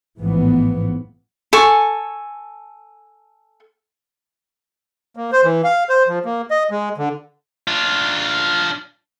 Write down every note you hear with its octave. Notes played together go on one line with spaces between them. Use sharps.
A1 G#2 E3 F3 B3
A4 G#5 C#6
A#3
C5
E3
F5
C5
F3
A#3
D#5
G#3
D3
D4 F4